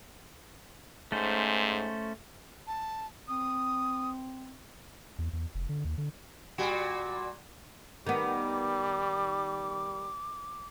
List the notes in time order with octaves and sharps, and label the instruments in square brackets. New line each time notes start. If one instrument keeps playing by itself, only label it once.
[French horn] G#2 [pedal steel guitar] A3 C#4 C5
[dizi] A5
[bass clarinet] C4 [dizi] D#6
[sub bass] E2
E2
F1
D3
D#2
D3
[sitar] A#2 G3 F#4
[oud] D#3 B3 [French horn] G3 [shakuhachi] D6